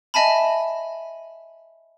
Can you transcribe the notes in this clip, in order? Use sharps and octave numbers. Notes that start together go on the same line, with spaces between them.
D#5 E5 G#5 A5 B5